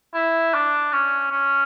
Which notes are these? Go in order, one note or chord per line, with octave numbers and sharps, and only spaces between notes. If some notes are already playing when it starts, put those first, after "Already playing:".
E4
D4
C#4
C#4